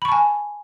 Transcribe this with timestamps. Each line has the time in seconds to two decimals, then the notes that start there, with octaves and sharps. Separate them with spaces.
0.02 B5
0.05 C#6
0.08 A5
0.12 G#5